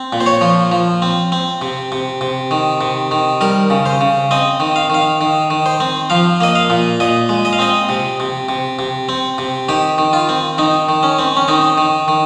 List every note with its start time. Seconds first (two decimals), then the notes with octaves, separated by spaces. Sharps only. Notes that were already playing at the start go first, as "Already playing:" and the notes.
Already playing: C4
0.13 A#2
0.20 C5
0.26 C#5
0.41 F3
0.72 F3
1.02 C4
1.32 C4
1.62 C3
1.92 C3
2.21 C3
2.51 D#3
2.81 C3
3.11 D#3
3.41 G3 A#4
3.70 C#3
3.86 C5
4.01 C#3
4.31 C4 D#5
4.60 D#3
4.76 F5
4.90 D#3 F5
5.21 D#3
5.50 D#3
5.66 C5
5.80 C4
6.10 F3 F5
6.40 A#3 D#5
6.55 F5
6.70 A#2
7.00 A#2 D#5
7.29 G#3
7.45 D#5
7.53 F5
7.59 C4 D#5
7.89 C3
8.20 C3
8.49 C3
8.79 C3
9.09 C4
9.38 C3
9.69 D#3 G4
9.98 D#3
10.13 F4
10.29 C4
10.58 D#3 D#4
10.89 D#3
11.03 C#4
11.19 C4
11.37 C#4
11.48 D#3 D#4
11.78 D#3
12.08 D#3